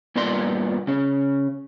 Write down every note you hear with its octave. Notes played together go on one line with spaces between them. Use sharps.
G2 A#2 A#3 B3 D5 C6
C#3 C#4